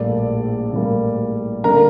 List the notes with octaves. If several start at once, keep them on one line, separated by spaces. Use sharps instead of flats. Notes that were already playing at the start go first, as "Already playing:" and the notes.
Already playing: A#1 A2 G3 A#3 D5
A#1 A2 G3 A#3
D3 G3 A#3 A#4 A#5